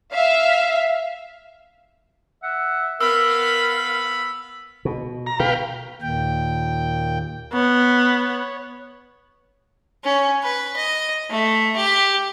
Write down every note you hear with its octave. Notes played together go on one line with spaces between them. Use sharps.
E5 F5
E5 F#5
B3 A#4 F5 B5 E6
B2
A#5
B2 B4 F5 G5
D#2 A#2 G5
B3 C#5
C#4
B4
D#5
A3
G4